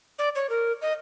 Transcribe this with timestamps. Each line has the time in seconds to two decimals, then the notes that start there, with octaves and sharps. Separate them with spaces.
0.19 D5
0.35 C#5
0.50 A#4
0.82 D#5